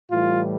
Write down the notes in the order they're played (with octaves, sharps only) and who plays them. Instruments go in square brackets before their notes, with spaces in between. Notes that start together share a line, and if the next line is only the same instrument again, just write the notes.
[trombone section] A2 E3 G3 F4